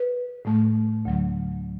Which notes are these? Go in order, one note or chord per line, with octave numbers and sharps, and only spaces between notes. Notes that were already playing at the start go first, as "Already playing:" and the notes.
Already playing: B4
A2 A3
D2 D3 F#3